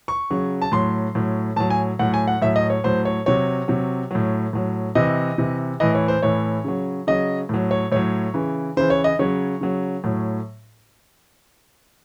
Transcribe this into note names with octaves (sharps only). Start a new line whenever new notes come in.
C#6
C#3 F#3
A5
A2 F#3 C6
A2 F#3
A2 F#3 A5
G#5
A2 F#3 F#5
G#5
F#5
A2 F#3 E5
D#5
C#5
A2 F#3 C5
C#5
C3 F#3 C#5
C3 F#3
A2 F#3
A2 F#3
C3 E3 D#5
C3 E3
A2 E3 D#5
C#5
C5
A2 E3 C#5
C#3 F#3
C#3 F#3 D#5
A2 F#3
C#5
A2 F#3 C#5
C#3 E3
C#3 E3 C5
C#5
D#5
C#3 F#3 C#5
C#3 F#3
A2 F#3